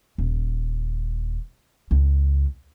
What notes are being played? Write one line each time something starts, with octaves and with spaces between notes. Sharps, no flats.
D#1
C#2